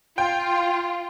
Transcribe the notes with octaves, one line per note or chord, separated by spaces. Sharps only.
F4 G5